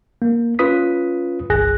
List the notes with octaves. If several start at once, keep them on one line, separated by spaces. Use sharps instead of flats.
A#3
C#4 F4 B4 D#6 B6
G1 C2 G#4 G#5 F#6 A#6